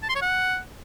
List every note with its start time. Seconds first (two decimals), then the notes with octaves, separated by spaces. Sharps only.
0.03 A5
0.09 C6
0.15 C#5
0.22 F#5